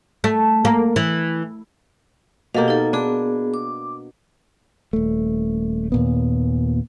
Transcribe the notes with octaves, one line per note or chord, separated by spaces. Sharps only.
A3
A#3
E3
B2 A#3 G4 A4 F5
D#4 A4
B3 D4 G#4
D6
D#1 A3
D#2 A#2 B3